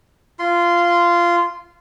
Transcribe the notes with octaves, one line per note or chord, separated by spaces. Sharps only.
F4 C6